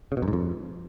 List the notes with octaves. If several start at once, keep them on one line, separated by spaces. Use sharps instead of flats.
C#3
B2
F#2
G#2
F2